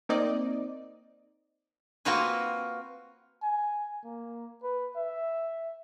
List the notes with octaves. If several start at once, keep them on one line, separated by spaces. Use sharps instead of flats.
A#3 C4 D#4 D5 D#5
A#3 C4 F4 F#4 B4 G#5
G#5
A#3
B4
E5